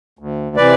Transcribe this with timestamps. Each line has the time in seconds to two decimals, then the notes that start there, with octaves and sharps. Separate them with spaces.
0.19 D2
0.56 C3 E3 B4 D5